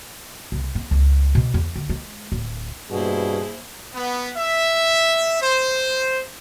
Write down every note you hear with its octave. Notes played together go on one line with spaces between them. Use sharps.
C2
C4
C#2
B2
E2
D2
G#3
D1
G2 B2 A#3 E4 G#4 C5
B3
E5
C5